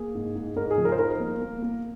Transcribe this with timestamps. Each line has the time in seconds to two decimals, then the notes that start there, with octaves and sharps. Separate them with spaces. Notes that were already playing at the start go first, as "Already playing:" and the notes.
Already playing: A#3 G#4
0.15 G#2
0.35 G#2
0.56 G#2 A#4
0.71 G#4
0.78 F3
0.85 A#4
0.92 C5
0.99 D#4 A#4
1.20 A#3
1.42 A#3
1.62 A#3